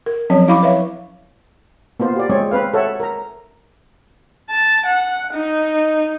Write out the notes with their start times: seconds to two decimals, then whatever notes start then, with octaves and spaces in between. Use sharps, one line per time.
0.06 A#4
0.30 F3 F#3 C4 C#4 C#5
0.48 E4 F5 A#5 B5 C#6 D6
0.63 B4 C#5 E5 F5
2.00 A#3 B3 F4 C5
2.16 G4 D5
2.30 G#3 C4 G#4 C#5 D5
2.51 C4 B4 F5
2.74 A4 C#5 E5 F#5
3.00 A#4 A#5
4.50 A5
4.86 F#5
5.34 D#4